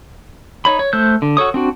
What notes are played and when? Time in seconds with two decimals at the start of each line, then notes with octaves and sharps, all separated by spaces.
0.65 D#4 C#5 B5
0.79 C#5
0.93 A3 C5 E6 F#6 G6
1.22 D3
1.37 F#4 A4 C#5 D#6
1.54 C4 D4 F#4